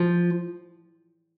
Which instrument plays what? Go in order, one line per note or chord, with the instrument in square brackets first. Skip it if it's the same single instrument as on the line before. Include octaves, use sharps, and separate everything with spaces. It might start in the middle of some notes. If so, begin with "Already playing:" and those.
Already playing: [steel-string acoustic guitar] F3